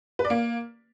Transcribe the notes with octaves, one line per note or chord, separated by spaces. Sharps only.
B4
D5
A#3